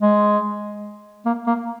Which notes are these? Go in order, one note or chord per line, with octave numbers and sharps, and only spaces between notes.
G#3
A#3
A#3